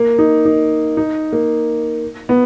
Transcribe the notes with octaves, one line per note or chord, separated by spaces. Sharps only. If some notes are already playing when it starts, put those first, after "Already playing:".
Already playing: A#3
D#4
D#4
D#4
A#3
B3